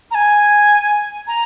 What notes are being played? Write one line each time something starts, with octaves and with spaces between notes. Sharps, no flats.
A#5
G#5
A#5